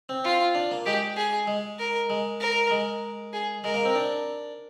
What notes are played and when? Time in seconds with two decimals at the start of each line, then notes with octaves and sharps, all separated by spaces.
0.09 C4
0.24 F4
0.55 D4
0.71 A#3
0.86 G#3 G4
1.17 G#4
1.47 G#3
1.79 A#4
2.10 G#3
2.40 A#4
2.71 G#3
3.33 G#4
3.64 G#3 A#4
3.74 A#3
3.85 C4
3.95 D4